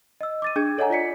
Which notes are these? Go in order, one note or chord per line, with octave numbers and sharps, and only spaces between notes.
D#5 E6
D6 A6 D#7
D4 G#4 G#6
A4 C#5 D#5 F#5 G#5 A#5
F4 D5 B6 C#7